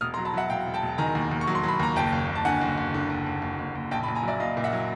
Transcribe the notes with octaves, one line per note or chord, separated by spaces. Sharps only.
E1 D#6 F6
A#5 C6
F#3
A5 B5
F#3 E5 F#5
E1 F5 G5
E1
G5 A5
E1
D#3 G#5 A#5
D#2
D#2
C#6
F#3
C6
F#3 B5
D#2 A#5
F#1 G5 A5
F#1
F#1
A5
D3 F#5 G#5
F#1
F#1
D3
F#1
F#1
F#1
F#1
F#1
A#1 G5 A5
A5 B5
A#1
G#5 A#5
F#3 D5 E5
A#1 D#5 F5
A#2
E5 F#5
F#3